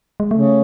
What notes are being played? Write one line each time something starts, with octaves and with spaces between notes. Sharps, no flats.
G#3
C#3 A3